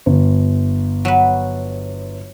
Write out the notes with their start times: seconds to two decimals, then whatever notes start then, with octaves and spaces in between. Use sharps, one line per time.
0.06 G1
1.05 F#3 B4